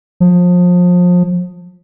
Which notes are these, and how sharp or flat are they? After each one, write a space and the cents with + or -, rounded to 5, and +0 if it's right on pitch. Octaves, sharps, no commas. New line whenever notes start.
F3 +30